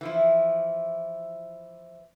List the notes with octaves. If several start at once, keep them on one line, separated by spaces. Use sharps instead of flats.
E3 F3 E4